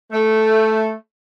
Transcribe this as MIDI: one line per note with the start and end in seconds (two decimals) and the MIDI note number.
0.11 0.92 57